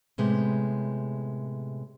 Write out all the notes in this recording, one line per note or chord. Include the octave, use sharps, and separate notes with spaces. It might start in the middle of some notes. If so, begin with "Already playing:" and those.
A2 C3 G#3 B3